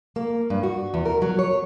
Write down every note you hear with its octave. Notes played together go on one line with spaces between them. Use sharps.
A#3
G2
F#4
E2
A#4
F#3
C#5